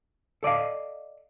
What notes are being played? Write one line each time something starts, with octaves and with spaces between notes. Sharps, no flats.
A4 D5 D#5 F5